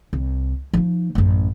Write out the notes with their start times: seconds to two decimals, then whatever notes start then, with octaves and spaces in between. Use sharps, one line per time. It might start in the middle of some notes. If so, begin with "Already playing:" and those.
0.13 C2
0.73 F3 D#4
1.15 A1 F#2